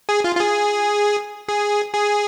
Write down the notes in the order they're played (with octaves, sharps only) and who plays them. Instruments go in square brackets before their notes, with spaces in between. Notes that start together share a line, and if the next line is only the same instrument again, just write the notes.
[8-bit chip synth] G#4
F4
F4
G#4
G#4
G#4